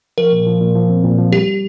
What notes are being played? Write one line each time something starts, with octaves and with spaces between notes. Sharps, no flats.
F3 A#4
A#2
F3
A#2
F3
C4
A#2
F3
G3 G4